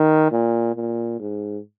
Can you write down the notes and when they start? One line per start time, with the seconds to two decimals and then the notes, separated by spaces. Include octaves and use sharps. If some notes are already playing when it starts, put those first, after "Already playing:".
Already playing: D#3
0.32 A#2
0.76 A#2
1.20 G#2